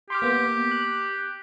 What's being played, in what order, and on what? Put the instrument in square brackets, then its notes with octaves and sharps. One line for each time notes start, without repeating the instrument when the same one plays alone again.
[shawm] G4 [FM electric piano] C6 D6 F6
[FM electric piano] A#3 B3
F#6